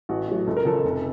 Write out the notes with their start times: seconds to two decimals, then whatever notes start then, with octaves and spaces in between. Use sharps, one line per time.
0.09 A1 F#4
0.28 A2 F#3
0.46 C#2 A4
0.57 A#4
0.65 C#3 F3 A4
0.84 F1